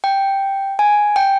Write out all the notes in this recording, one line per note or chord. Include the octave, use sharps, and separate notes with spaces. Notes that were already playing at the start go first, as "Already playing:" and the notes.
G5
G#5
G5